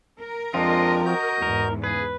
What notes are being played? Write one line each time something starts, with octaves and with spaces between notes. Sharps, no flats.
A#4
F2 F3 G#3 C4 D4 F4 D#5
F#4 D#5 G6
E2 G#2 A#4
C#3 G#4 B4